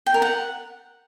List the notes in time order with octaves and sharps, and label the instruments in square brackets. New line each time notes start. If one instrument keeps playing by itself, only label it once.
[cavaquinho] G5
A#4
F#5